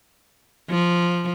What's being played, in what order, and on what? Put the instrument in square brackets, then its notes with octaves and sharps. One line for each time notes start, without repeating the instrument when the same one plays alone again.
[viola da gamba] F3